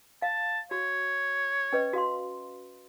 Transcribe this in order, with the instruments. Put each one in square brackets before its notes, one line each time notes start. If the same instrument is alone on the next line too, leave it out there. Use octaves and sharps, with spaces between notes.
[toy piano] F5 [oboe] A5
[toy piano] F#4 [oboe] C#5
[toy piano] C#4 B4 D#5
F#4 F5 C6